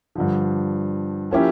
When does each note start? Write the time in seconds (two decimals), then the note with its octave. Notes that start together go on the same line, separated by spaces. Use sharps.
0.15 G2 D3 F3
1.31 F3 A#3 C#4 E4 G4